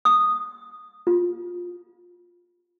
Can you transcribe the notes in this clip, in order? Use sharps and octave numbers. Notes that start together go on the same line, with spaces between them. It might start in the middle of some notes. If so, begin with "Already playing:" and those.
D#6
F4